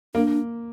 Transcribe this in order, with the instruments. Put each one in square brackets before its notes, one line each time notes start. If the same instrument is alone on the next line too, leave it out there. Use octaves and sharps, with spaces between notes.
[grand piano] A#3 [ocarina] D4